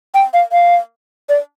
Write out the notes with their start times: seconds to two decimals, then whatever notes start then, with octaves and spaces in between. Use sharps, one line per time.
0.14 G5
0.34 F5
0.52 F5
1.29 D5